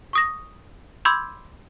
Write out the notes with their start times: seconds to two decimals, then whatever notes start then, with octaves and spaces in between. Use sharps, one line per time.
0.13 C#6 D#6 A#6
1.05 B5 C6 D6 E6 G6 G#6